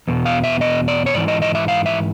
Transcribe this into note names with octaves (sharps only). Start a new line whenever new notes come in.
E2 B2
F5
E5
D#5
D5
C#5
G#2 E3 D5
D#5
D#5
E5
F5
E5